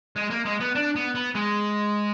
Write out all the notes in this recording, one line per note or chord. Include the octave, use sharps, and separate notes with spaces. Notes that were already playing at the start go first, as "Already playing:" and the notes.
G#3
A#3
G#3
B3
D4
B3
B3
G#3